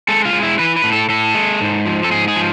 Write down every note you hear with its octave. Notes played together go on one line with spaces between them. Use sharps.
G#3 A4
F4
G#3
E4
E3 B4
B4
A2
A4
A2 A4
G#3
G#2
F3
A4
G#2 G#4
G#4
F3